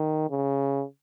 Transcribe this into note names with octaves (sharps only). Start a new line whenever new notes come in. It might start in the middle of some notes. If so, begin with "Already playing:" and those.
Already playing: D#3
C#3